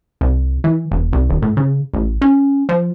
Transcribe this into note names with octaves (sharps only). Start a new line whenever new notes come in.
C2
E3
E1
C2
D#1
A2
C#3
A1
C#4
F3